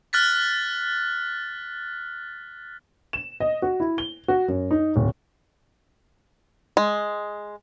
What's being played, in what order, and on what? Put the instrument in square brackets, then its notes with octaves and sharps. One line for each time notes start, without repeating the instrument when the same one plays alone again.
[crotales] F6 F#6 A6 B6
[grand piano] E7
D#5
F#4
E4
G7
F#4
F#2
D#4
D1
[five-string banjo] G#3